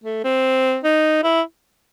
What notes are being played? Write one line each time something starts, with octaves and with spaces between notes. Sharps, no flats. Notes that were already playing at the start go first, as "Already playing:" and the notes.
A3
C4
D#4
E4